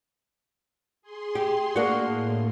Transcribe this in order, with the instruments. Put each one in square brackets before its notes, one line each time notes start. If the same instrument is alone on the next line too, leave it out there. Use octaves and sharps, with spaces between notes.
[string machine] G#4 C6
[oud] G4
A#3 D4 F#4
[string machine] A2